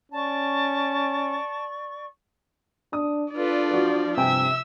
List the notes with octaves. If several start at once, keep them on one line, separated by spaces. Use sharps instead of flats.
C#4 D5 A5 C#6
D4 D#6
D4 F4 A4 B4 D5
F3 F#4
G2 C3 E5 G5 G#5 E6